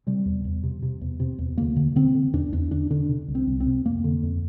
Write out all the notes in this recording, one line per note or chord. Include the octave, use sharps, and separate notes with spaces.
C3 G3
E2
E2
C3
C3
E2
C3
E2
D2 A#3
D3
D3 C4
D3
E2 D4
E2 D4
D3 D4
D3 D4
C3
C2
C4
C2
C4
C3
F2 A#3
D3
F2